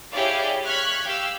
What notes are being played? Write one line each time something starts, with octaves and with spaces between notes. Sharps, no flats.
E4 G4 G#4 C#5 D5 F5
C#6 F6 F#6 G#6 B6
G4 F5 E6